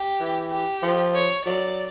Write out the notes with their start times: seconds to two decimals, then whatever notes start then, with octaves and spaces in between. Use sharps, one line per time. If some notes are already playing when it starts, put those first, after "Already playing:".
Already playing: G4
0.20 E3
0.51 G4
0.83 F3
1.15 C#5
1.45 F#3 D5